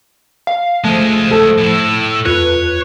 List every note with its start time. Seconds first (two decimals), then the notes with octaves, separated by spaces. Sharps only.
0.47 F5
0.84 F3 G#3 A3 F4
1.31 A4
1.58 A2 E4
2.26 E2 F4 B4 C#5